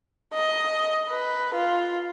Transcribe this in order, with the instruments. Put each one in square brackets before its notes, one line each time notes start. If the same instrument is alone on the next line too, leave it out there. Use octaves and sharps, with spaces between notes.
[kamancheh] D#5
B4
F4